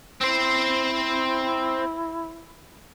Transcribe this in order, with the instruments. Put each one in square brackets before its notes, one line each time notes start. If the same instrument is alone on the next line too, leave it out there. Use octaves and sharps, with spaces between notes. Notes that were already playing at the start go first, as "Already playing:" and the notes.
[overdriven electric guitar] C4 C5 [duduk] E4